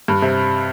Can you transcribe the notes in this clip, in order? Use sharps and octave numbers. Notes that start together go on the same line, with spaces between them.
G2
C3